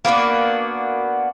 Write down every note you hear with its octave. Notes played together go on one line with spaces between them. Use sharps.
A#3 B3 D4 F#4